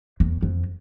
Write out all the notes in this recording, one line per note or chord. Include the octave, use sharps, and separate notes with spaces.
E2
F2